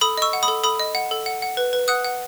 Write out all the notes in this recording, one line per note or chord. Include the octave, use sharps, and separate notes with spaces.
A4 B5 D#6
D#5 C#6 E6
F#5
B5 D#6
A4
A4 B5 D#6
D#5
F#5
A4
F#5
F#5
B4
B4
F#5 D#6 F#6
F#5